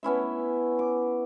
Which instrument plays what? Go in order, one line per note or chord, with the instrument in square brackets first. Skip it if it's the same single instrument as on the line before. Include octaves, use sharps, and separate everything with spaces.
[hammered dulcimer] B3 C#4 E4 E5
D6